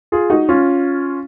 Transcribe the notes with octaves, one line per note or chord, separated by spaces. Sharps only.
F4 G#4
D#4 F#4
C#4 F4